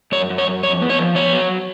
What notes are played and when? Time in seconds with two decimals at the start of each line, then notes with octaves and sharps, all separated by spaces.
0.12 F#2 C#5
0.30 F#2
0.38 C#5
0.47 F#2
0.63 F2 C#5
0.81 B3
0.90 C#5
0.98 F3
1.15 B3 C#5
1.33 F#3